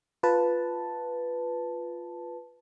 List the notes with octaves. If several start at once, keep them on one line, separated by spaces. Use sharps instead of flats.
F4 B4 A5